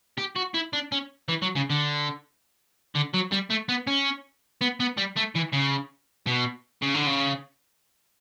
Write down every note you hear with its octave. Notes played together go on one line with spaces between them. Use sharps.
G4
F#4
E4
D4
C#4
E3
F#3
C#3
D3
D3
F#3
G3
A3
B3
C#4
B3
B3
G3
A3
E3
C#3
B2
C#3
D3
C#3